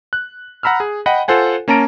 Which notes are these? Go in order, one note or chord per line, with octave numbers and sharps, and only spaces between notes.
F#6
F#5 A#5 B5 E6 F6
G#4
D#5 F#5 G5 B5
F4 A4 C5 F#5 G#5
A#3 C#4 A5 A#5 D7